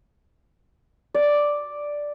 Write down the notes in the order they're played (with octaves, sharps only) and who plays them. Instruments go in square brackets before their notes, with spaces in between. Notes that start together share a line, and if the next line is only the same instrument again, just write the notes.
[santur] D5